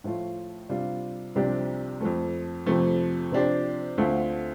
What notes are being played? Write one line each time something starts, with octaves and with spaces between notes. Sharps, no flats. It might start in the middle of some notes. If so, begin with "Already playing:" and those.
A2 F3 A3 F4
C3 G3 D4 F4
C2 C3 F3 D4 G4
F2 F3 A3
F2 C3 F3 A3
C3 F3 D4 G4 C5
D2 D3 A3 C4 F4